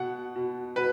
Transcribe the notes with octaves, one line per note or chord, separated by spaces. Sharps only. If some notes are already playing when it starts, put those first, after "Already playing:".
Already playing: B2 F#5
B2
B2 B4